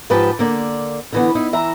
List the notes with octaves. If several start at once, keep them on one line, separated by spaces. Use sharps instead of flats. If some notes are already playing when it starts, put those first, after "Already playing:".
G#2 F3 G4 B4 G5 A5
D3 A#3 D5
D3 E3 B3
D#4 E4
E3 E5 A#5